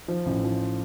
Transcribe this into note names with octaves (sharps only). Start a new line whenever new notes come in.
F3
A1
F3